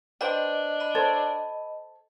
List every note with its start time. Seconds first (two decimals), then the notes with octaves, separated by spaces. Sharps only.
0.21 D4 B4 C5 D#5 G5
0.80 D#5 B5
0.95 A4 C5 C#5